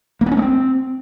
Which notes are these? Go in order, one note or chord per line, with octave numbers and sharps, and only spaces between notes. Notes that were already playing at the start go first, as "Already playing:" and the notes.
A#3
B3
C#4
A3
C4